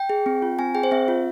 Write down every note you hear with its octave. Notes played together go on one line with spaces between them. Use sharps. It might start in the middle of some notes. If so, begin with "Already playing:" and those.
Already playing: G5
G#4
C4
F4
C4 G#5
G#4 G5
C5
C4 E5
F4